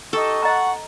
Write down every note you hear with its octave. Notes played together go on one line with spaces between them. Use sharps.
D#4 G4 A4 D#5 C#6
D#5 F#5 A#5